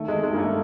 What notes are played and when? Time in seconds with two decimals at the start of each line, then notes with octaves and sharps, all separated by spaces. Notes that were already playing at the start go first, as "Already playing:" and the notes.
Already playing: D#3 A3
0.08 G#3
0.13 D#3
0.23 G#3
0.33 G2 A#3
0.39 A3